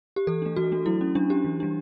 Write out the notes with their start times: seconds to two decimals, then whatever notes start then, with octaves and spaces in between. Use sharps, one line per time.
0.16 G4
0.27 E3 A4
0.42 A3 D4
0.56 E3 F#4
0.72 A3 D4
0.86 F#3 E4
1.01 C#4
1.15 F#3 D4
1.30 C#4 G4
1.45 E3
1.60 G3 D4